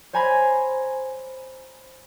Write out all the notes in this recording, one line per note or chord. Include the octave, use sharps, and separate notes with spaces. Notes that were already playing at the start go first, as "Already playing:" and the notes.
C5 C#5 G#5 A#5 B5 G#6